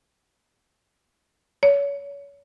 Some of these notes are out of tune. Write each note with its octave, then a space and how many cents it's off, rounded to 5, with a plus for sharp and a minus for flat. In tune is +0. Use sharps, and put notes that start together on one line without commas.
C#5 +30